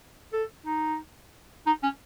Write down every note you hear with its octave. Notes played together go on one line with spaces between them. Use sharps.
A4
D#4
D#4
C#4